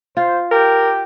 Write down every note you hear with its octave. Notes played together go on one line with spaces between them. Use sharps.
F4 C5
G4 A#4 G5